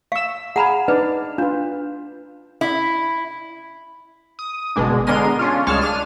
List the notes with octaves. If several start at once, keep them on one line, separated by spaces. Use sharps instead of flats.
F5 C#6 E6
G#4 F5 F#5 G#5 A#5 B5
D4 D#4 B4 D5
D4 F4 B4
E4
D#6
G1 B2 G#3 D4
D3 G#3 B3 A#4 C6 D#7
C#4 D4 F4
C#2 G3 G#3 C#5 A5 F6
D4 F6 D#7